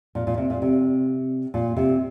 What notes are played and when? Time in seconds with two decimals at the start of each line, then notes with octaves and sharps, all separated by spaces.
0.15 A#2
0.27 A#2
0.38 C3
0.50 A#2
0.62 C3
1.54 A#2
1.76 C3